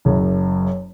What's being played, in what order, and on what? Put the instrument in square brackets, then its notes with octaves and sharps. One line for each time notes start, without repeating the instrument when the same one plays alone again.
[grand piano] F#1 F#2